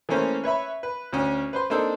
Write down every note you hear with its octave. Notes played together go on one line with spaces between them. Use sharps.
E3 A3 A#3 C#4 C5
B4 C#5 E5 B5
B4
D2 C#4
B4 C5 C6
A#3 C4 D4 D#4 A4 C5